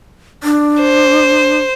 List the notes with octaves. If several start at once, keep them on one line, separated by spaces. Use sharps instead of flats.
D4
C5